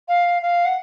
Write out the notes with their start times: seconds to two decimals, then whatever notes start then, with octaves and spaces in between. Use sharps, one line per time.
0.08 F5
0.42 F5
0.65 F#5